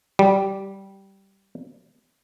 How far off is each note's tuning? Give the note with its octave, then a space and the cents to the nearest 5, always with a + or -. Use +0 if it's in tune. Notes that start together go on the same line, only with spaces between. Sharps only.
G3 -10